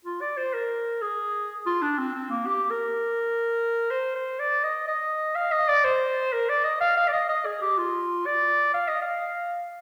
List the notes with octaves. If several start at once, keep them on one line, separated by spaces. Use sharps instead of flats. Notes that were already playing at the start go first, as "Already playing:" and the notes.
F4
D5
C5
A#4
G#4
F4
D4
C4
C4
A#3
G4
A#4
C5
C5
D5
D#5
D#5
F5
D#5
D5
C5
A#4
D5
D#5
F5
F5
D5
D#5
D#5
G#4
G4
F4
D5
F5
D#5
F5